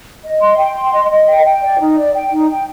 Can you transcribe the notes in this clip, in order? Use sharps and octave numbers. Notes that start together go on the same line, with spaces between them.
D#5
C6
G5
C6
D#5
D#5
G5
G5
D5
D#4
D5
G5
D#4
G5